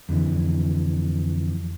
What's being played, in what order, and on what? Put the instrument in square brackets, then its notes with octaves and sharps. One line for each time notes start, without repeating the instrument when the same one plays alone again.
[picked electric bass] F2 D3 E3